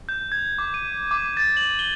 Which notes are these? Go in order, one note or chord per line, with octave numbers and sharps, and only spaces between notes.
G6
G#6
D6
D#7
D6
A6
F#7
G7